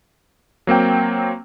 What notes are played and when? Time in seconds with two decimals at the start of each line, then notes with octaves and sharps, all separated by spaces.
0.67 F#3 A#3 C4 G5